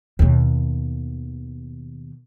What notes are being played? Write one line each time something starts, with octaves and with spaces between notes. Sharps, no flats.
D#2 B2